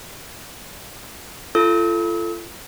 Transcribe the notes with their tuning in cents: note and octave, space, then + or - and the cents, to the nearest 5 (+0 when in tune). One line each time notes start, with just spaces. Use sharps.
F4 -35 A4 +0 E6 -45